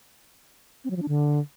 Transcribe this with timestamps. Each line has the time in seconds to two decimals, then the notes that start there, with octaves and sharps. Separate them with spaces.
0.84 C4
0.90 F#3
0.96 F3
1.02 D4
1.08 D3